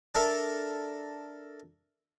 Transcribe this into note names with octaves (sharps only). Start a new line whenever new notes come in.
D4 A4 A#4 E5